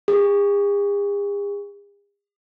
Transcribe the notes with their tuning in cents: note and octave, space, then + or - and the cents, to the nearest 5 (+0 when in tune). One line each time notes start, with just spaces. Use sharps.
G#4 -45